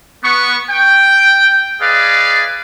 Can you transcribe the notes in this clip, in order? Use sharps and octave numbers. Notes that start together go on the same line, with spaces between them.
B3 C#6
G5
G#4 B4 D5 D#5 F5